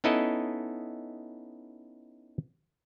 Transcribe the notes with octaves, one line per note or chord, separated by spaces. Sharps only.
B3 C#4 D#4 E4 A4 D#5